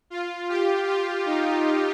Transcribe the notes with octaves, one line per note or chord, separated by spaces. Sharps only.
F4
G4
F4
D#4